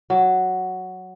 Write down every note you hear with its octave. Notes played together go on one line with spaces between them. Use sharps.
F#3